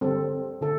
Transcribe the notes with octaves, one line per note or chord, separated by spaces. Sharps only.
D3 G3 C4 A4
D3 A4